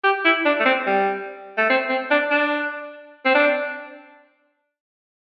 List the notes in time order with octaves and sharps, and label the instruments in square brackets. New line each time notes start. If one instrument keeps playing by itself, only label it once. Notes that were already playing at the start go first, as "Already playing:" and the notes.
[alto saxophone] G4
E4
D4
A3
C4
G3
A3
C4
C4
D4
D4
C4
D4